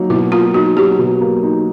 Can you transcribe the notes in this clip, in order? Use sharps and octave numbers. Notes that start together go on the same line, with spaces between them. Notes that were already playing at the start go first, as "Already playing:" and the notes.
Already playing: F#3 A#3 D#4
B2 E4
A#3 F4
D#4 F#4
F#3 G4
B2
A#3
D#4